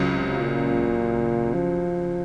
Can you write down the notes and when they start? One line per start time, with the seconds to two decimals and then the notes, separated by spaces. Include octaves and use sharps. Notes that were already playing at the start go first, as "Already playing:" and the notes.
Already playing: C#2 C#3 F#3 C#4 F4
0.11 C3
0.40 A#2
1.54 F3